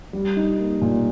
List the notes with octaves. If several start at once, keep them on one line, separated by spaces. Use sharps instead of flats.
G3
D#4
A#3
A#2